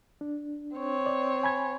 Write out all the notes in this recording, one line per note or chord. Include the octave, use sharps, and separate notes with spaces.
D4
C4 C#5
D5
G#5 B5 G#6